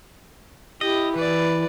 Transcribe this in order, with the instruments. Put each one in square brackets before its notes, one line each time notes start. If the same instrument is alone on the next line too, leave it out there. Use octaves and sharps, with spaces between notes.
[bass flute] E4 [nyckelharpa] G4 [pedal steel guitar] D#5
[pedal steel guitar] E3 [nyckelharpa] B4 D5